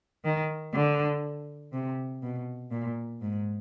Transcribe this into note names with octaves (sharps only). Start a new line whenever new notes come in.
D#3
D3
C3
B2
A#2
G#2